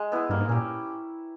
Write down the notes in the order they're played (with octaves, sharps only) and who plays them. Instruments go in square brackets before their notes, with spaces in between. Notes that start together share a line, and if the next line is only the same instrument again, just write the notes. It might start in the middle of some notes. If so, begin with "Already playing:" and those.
Already playing: [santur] G#3
B3 E4 G#4
[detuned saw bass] G2 [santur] A#3
[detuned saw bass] G#2
[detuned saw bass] A#2 [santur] C#4 G4